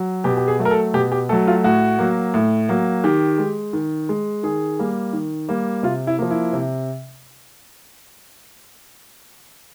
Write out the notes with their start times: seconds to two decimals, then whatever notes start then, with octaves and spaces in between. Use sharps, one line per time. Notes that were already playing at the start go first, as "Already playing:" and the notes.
Already playing: F#3
0.24 B2 G4
0.37 G4
0.48 G#4
0.59 F#3 A3
0.65 A#4
0.71 A4
0.94 B2 G4
1.12 G4
1.29 A3 A4
1.32 F#3
1.47 F4
1.64 A2 F#4
1.99 F#3 A#3
2.34 A2
2.69 F#3 A#3
3.04 D#3 G4
3.38 G#3
3.73 D#3
4.09 G#3
4.43 D#3 G#4
4.79 G3 A#3
5.13 D#3
5.48 G3 A#3
5.83 C3 F4
6.07 E4
6.18 F3 A#3
6.31 E4
6.53 C3